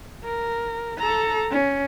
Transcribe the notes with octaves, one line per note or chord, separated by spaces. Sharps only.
A#4
A4 A#5
C#4